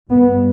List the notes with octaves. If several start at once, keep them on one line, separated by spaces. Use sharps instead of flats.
G2 B3